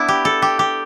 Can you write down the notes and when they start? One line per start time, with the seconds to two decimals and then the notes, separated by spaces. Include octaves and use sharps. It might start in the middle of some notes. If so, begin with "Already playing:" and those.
Already playing: B3 D4 E4
0.08 G4
0.25 A4
0.42 G4
0.59 G4